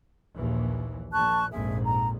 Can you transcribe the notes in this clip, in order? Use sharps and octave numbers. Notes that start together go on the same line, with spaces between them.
A#1 D#2 E3
A#1 A#2 A5 C#6 F#6
A#1 F2 G#2 G#4 E5
A#5